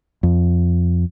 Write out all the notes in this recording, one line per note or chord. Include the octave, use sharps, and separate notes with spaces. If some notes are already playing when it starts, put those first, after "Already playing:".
F2